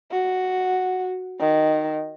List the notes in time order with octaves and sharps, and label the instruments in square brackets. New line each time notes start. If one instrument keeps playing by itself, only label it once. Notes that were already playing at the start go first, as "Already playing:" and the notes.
[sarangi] F#4
D#3